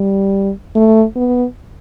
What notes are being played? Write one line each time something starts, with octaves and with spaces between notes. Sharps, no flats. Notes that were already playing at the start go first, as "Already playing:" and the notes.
Already playing: G3
A3
B3